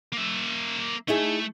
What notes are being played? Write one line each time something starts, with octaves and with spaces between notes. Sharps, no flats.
A#3 E5
A3 D#4 E4 G#4